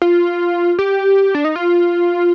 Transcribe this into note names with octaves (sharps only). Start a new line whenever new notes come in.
F4
G4
D4
D#4
F4